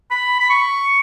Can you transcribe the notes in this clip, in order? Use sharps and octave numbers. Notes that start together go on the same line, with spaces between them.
B5
B5
C#6